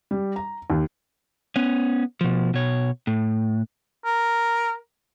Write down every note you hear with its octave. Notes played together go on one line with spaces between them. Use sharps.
G3
A#5
D#2
B3 C#4
B2 F3
B2 C#5
A2
A#4